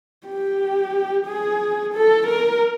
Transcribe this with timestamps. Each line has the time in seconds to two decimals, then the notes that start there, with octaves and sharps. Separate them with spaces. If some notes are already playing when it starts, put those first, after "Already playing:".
0.27 G4
1.26 G#4
1.94 A4
2.27 A#4